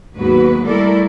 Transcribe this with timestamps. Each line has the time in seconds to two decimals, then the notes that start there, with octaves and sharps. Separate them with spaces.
0.13 D#2 G#2 F#3 B3 F#4 B4
0.65 G3 A3 E4 A4 A#4 D5